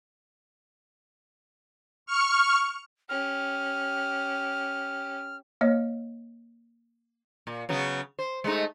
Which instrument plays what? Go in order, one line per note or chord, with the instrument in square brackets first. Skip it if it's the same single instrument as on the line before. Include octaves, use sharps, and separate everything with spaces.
[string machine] C#6 F6
[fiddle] C#4 G4 [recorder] F6
[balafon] A#3 C#5 D#5
[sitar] A#2
C#3 F#3 B3
C5
G#3 A3 D#4